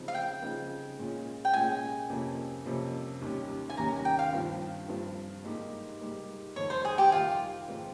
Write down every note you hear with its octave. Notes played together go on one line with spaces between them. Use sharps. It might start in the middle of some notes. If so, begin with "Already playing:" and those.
Already playing: C#3 F3 C4 D#4
F5
G5
C#3 F3 C4 D#4
A#2 G#3 C#4 F4
G5
A#2 G#3 C#4 F4 G#5
F2 C3 F3 A#3 C#4
F2 C3 F3 A#3 C#4
D#2 D#3 G3 C#4 G4
G#5
D#2 D#3 G3 C#4 G4 A#5
G5
F5
G2 F3 C4 F4
G2 F3 C4 F4
G#2 G3 A#3 D#4 G4
G#2 G3 A#3 D#4 G4
F2 D#3 G3 C#5
C5
G#4
G4
F2 D#3 G3 F4
G#2 F3 C4